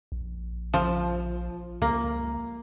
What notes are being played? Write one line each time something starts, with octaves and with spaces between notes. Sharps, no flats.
A#1
F3
C#2 A#3